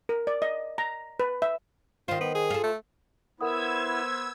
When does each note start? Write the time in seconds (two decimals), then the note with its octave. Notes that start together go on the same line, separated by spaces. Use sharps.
0.09 A#4
0.27 D5
0.42 D#5
0.78 A#5
1.20 B4
1.42 E5
2.08 D#3 F4 C5
2.21 B3
2.35 G#4
2.50 F4 A4
2.64 A3
3.41 B3 E4 A#4 C5 F#5 D#6 E6 G#6